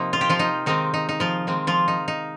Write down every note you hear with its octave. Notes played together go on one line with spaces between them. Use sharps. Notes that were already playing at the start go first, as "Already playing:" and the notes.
Already playing: C3 F3 A#3 D#4
F4
G4
F3 F4
D#4
D#3 G#3 C4 D#4
D#4
D#4
F3 F4
D#3 G#3 C4
F3 F4
D#4
D#4